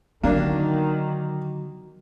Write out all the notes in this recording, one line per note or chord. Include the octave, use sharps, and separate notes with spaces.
D3 D#3 F#3 A#3 B3 D4